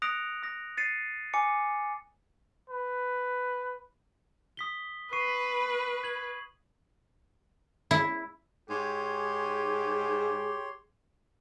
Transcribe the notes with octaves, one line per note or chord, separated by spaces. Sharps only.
D#6 F#6 A#6 C#7 D7 F7
D#6 A#6
A6 C7 C#7 D#7
G#5 D6 C#7
B4
D#6 B6 G7
B4 C#6 C7 D#7
G#6 F#7
E4
G#2 G4 G#4 C#5 C6